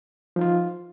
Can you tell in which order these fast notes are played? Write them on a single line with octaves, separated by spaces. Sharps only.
F3 D#4 F4